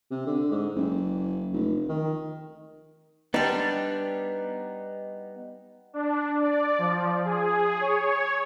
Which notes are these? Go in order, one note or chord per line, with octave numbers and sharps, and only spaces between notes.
C3
D3
G#2
F#1
F1
D#3
G3 B3 D4 D#4
D4
D5
F3
G#4
C#5